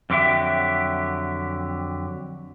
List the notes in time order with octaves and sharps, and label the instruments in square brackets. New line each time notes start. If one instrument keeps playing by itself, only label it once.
[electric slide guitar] F2 D3 F#3 G4 E5